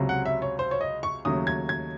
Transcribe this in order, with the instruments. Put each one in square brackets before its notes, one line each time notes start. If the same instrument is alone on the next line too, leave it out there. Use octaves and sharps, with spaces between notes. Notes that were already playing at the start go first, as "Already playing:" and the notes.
Already playing: [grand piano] C#2 C3 F#3
F#5
E5
C#5
C5
C#5
D#5
C#6
D#2 C#3 F#3 A3 D#6
G#6
G#6